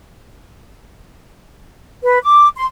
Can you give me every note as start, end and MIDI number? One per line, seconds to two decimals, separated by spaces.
2.03 2.18 71
2.23 2.48 86
2.56 2.65 84